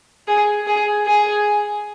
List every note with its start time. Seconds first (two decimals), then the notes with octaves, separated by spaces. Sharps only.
0.28 G#4
0.67 G#4
1.06 G#4